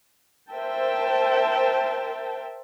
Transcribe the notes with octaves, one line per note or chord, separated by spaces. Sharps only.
A#4 C5 E5 G5 A5